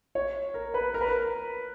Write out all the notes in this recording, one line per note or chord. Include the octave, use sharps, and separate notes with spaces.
C#5
A#4
B4
A#4
B4
A#4